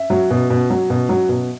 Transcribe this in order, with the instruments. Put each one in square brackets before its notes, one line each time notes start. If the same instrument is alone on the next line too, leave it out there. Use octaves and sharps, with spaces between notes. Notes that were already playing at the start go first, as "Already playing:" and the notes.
Already playing: [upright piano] E5
F#3
B2
B2
F#3
B2
F#3
B2